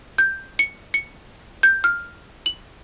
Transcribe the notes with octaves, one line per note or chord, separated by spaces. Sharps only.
G6
C#7
C#7
G6
F6
F#7